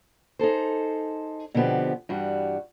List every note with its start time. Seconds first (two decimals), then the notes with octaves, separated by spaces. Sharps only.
0.39 D#4 G#4 A4 C5
1.54 B2 D3 F3 B3 C4 G4
2.09 G2 E3 G3 F#4